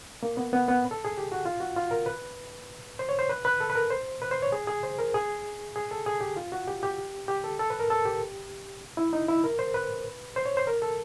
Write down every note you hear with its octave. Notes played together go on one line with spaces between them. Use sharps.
A#3
B3
B3
B3
A4
G#4
G4
F#4
F4
F#4
F4
A#4
B4
C5
C#5
C5
B4
B4
A4
B4
A#4
C5
B4
C5
C#5
G#4
G#4
C5
A#4
G#4
G#4
A4
G#4
G4
F4
F#4
G4
G4
G4
A4
A4
B4
A#4
A4
G4
E4
D#4
E4
A#4
C5
B4
C5
C#5
C5
A#4
A4